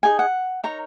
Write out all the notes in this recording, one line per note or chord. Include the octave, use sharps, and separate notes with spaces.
D#4 G#4 D#5 G#5
F#5
D#4 A#4 C#5 A#5